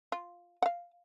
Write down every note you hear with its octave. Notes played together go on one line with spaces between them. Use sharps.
F4
F5 F#5